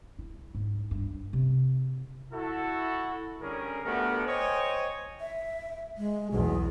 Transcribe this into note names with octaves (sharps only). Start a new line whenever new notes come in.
E4
G#2
G2
C3
E4 F#4 A4
D3 G3 C#4 G#4 A#4
A3 B3 D4 F#4 G4 A#4
C5 C#5 D#5 G5 G#5
E5
G#3
B1 E2 G#4